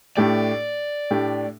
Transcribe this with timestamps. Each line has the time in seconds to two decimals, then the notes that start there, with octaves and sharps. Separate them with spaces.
0.17 A2 A3 D4 G4 D5
1.11 A2 A3 D4 G4